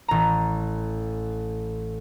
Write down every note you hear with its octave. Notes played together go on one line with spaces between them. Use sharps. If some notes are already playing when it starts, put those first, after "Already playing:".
A1 A#5